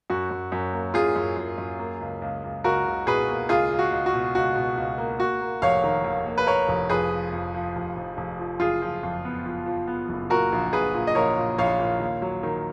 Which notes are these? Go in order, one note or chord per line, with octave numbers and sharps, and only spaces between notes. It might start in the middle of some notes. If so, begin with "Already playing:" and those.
F#2 F#4
F#2
F#2
A#3
F#2 F4 G#4
F#2
F#2
F#2
A#3
C#2
C#2
C#2
C#2 F#4 A#4
C#2
B2 G#4 B4
A#3
C#2 F4 G#4
C#2
F#4
C#2
F#4
B2
C#2 F#4
B2
C#2
A#3
A#3 F#4
A#3
F1 C#5 F5
D#3
D#2
A#3
B4
A#3 A#4 C#5
F1
F2 G#4 B4
F3
F2
F3
F1
F1
F1
F3
F#1 F4 G#4
F3
F2
B3
F3
F3
B3
F#1
A#2 F#4 A#4
A#1
A#1 G#4 B4
A#2
D#5
A#1 A#4 C#5
A#2
A#1 C#5 F5
A#2
D#2
F#3
D#3